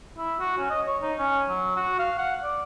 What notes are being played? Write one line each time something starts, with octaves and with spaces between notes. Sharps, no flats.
E4
F#4
C#4
D#5
C#5
D#4
C#4
F#3
F#4
F5
F#5
D5